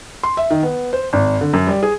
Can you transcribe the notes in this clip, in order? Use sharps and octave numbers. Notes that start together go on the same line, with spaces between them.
C6
E5
D#3
B3
C5
G#1
D3
F#2
G3
G#4